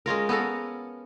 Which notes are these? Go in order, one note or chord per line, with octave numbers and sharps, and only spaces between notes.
G#3 C#4 F4 A#4
B3 C#4 A4 A#4